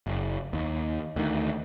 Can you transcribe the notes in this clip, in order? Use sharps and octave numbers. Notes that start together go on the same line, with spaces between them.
F#1
D#2
D2 D#3